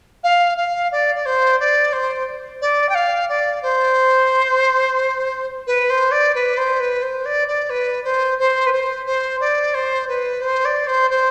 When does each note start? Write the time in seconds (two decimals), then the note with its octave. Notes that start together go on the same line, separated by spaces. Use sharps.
0.23 F5
0.57 F5
0.92 D5
1.15 D5
1.25 C5
1.60 D5
1.93 C5
2.61 D5
2.89 G5
2.95 F5
3.29 D5
3.62 C5
5.67 B4
5.90 C5
6.11 D5
6.35 B4
6.57 C5
6.80 B4
7.02 C5
7.25 D5
7.48 D5
7.70 B4
8.04 C5
8.39 C5
8.66 B4
8.72 C5
9.06 C5
9.40 D5
9.74 C5
10.08 B4
10.41 C5
10.65 D5
10.87 C5
11.10 C5